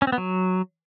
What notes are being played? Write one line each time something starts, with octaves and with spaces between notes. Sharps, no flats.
C#4
C4
B3
F#3